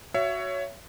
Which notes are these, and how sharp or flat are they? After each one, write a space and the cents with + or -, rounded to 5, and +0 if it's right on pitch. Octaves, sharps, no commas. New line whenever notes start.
F#4 +0 C#5 +10 E5 +25